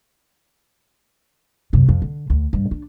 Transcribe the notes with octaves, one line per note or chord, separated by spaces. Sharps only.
F#2 C3
F2
D3
D2
G2
D4